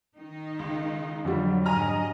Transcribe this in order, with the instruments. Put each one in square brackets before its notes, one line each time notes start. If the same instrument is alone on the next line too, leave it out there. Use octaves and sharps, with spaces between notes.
[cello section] D#3 D#4
[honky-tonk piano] C#2
[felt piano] F2 D3 G3 [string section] F#3 [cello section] D4
[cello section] G#2 D4 D#5 [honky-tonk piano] G#5 A#5 F6